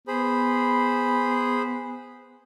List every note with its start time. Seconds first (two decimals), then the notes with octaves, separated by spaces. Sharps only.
0.08 B3 G#4 C5 B5